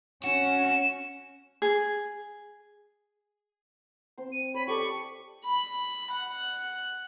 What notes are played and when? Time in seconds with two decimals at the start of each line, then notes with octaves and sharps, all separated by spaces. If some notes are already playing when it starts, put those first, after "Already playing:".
0.24 C#4 F#4 E7
1.62 G#4
4.18 C4 C6
4.32 D#7
4.54 C#5 B5
4.67 G4 A4 D5 C#6
5.45 B5
6.11 F#5